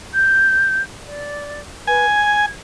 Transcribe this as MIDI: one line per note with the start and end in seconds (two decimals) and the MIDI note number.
0.14 0.81 91
1.05 1.59 74
1.87 2.06 71
1.87 2.46 80
2.14 2.52 92